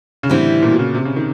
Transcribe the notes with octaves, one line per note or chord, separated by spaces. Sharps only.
C#3
A2 D3 E3 G3 C4 E4
A#2
B2
C#3
C3
C#3
D#3